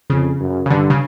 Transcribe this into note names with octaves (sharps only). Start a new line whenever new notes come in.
F2 C#3
F#2
C#3
G2 D3
C#3